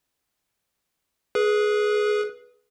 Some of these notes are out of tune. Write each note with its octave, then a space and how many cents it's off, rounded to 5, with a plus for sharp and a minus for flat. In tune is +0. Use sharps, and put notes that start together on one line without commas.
G#4 +15 B4 -15